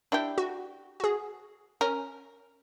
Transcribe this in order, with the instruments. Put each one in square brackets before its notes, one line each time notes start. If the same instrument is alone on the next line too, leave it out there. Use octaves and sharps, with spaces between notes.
[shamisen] D4 E4 G4
[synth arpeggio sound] F#4
F#4 G#4
[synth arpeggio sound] C#4 [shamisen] A#4